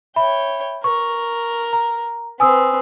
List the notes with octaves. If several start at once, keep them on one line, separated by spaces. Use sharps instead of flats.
C#5 E5 G5 B5
A#4 C#6
A#5
C4 B4 G#5 D#6 E6